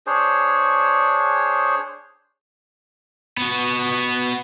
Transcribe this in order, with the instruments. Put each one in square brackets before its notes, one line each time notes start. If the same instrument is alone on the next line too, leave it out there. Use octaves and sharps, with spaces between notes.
[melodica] D4 G#4 C5 C#5
[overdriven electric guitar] B3 F#4